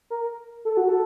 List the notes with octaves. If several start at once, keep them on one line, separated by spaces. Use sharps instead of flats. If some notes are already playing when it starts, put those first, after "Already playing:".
A#4
A4
F#4
A4